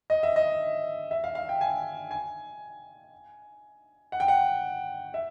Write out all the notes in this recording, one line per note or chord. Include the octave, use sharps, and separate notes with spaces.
D#5
E5
D#5
E5
F5
F5
G5
G#5
G#5
F#5
G5
F#5
E5